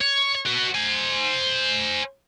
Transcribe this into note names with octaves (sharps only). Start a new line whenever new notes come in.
C#5
F#4 B4
C5 G#5